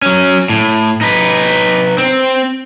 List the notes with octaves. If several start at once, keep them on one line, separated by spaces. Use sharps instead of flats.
F#3 C#4
A2
D#4 B4
C4